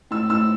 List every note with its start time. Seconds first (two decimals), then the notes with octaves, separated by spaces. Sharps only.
0.11 A2 E6
0.29 A2 E6